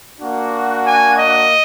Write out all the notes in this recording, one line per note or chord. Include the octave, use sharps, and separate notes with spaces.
A#3 D4 F#4
G#5
D#5